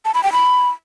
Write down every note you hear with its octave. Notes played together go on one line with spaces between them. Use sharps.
A5
B5
G5
B5